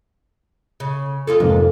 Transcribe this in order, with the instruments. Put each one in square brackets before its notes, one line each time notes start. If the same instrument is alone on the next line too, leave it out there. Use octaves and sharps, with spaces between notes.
[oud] C#3
F4 G#4 A4
[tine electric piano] F2 G#2 A#3 [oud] C3